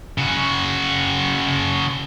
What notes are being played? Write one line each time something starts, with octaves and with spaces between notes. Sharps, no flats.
C#3 F#4